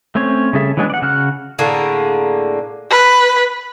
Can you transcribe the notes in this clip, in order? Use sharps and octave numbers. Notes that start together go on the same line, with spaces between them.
A3 C4 C#4 C#5
C#3 G3 G#4 A4 E5
E3 F#3 G#3 B3 D4
D5 F#5
C#3 F#4 F6 F#6
A2 D3 A#3 G#4
B4